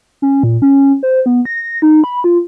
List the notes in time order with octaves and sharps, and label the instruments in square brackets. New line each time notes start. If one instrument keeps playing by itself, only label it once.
[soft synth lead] C#4
A#2
C#4
C5
B3
A#6
D#4
B5
F4